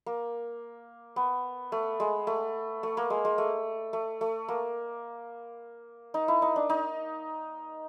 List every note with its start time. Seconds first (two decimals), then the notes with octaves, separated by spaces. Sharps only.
0.06 A#3
1.16 B3
1.72 A3
2.00 G#3
2.27 A3
2.83 A3
2.97 A#3
3.10 G#3
3.25 G#3
3.38 A3
3.93 A3
4.21 A3
4.48 A#3
6.14 D#4
6.28 E4
6.42 D#4
6.56 D4
6.70 D#4